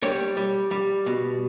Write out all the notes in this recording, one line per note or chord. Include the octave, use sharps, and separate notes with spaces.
G3 C#5
G3
G3
B2